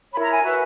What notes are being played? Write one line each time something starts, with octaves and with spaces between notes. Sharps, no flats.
E4 A#4 C#5 B5
A#5
G#5
F#4 B4 E5